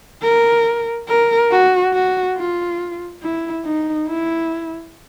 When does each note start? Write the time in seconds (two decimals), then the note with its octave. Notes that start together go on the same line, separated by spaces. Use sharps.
0.22 A#4
1.08 A#4
1.51 F#4
1.93 F#4
2.36 F4
3.22 E4
3.65 D#4
4.08 E4